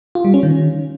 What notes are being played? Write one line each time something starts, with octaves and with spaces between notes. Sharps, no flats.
F4
G3
C#4
D#3